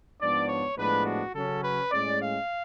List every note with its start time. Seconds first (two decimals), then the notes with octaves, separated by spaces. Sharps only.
0.20 G#2 F3 B3 D4 D5
0.48 C#5
0.77 A2 F3 G#3 B3 D4 B4
1.05 F#4
1.34 C#3 F#3 C#4 A4
1.63 B4
1.91 A2 G#3 C#4 D5
2.21 F5